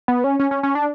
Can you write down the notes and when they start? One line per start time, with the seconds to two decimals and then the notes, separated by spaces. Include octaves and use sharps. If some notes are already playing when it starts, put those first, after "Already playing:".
0.08 B3
0.24 C#4
0.39 C#4
0.51 C#4
0.63 C#4
0.75 D4